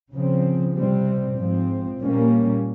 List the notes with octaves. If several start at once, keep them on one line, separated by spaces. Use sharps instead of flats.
C#3 F3 C4
C3 G3 C4
G#2 F3 C4
A#2 G3 A#3 C#4